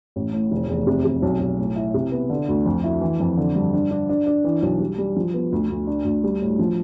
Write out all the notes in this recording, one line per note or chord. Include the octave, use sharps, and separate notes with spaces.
A1
A2
F1
E2
C3
C3
B1
B1
A2
E4
C3
B3
D3
D2
F2
E4
E3
F2
D3
G2
D4
D4
D4
D4
E3
B1
G3
G3
F3
B3
D2
D2
D4
D2
G3
A2
F3